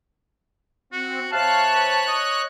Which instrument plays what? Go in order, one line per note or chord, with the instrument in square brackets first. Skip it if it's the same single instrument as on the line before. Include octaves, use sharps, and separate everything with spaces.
[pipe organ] C4 [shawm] F#4
[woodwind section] C3 A5 [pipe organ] C#5 F#6 [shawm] F5
[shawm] B4
D#5